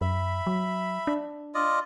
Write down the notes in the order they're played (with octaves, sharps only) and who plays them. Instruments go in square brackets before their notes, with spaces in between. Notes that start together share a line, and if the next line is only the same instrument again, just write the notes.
[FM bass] F#2 [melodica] E5 B5
[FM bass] F#3
D4
[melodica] F4 D5 D#5